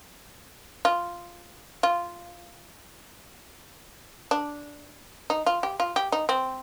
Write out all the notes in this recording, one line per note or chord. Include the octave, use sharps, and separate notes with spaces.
F4
F4
D4
D#4
F4
G4
F4
G4
D#4
C4